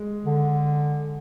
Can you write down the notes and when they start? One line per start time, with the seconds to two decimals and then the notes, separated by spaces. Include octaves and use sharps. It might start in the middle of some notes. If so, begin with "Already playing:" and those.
Already playing: G#3
0.25 D3